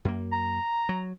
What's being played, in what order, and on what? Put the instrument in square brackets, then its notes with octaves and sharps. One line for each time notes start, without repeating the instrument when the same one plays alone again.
[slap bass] F#2 A#3
[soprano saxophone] A#5
[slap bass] F#3